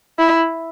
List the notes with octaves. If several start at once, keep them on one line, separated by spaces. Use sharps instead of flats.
E4